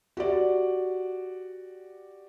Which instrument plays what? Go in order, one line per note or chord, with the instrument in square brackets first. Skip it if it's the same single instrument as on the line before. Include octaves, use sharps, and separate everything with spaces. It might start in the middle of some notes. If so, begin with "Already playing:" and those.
[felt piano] F#4 G4 D5